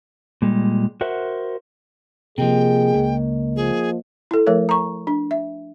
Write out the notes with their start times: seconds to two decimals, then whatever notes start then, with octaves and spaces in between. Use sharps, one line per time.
0.42 A#2 G3 G#3
1.01 F#4 A#4 C5 E5 F#5
2.38 C3 F3 A#3 G#4 A#4 D#5 G5
2.94 C#2
3.56 F3 G#4
4.31 E4 A4
4.47 F3 A3 A#4 C#5
4.69 A#5 C#6
5.07 D4
5.31 E5